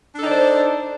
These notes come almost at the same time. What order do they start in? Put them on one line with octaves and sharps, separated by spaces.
D4 A4 D#4 D5 C5